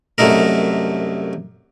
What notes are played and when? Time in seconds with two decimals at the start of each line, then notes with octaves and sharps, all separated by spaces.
0.18 C2 F#2 A3 D#4 A#4